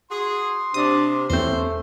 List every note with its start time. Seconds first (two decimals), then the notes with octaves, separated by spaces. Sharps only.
0.11 F#4 G#4 C6
0.74 C3 D4 D#6
1.30 E2 G2 A3 C4 C#4 C5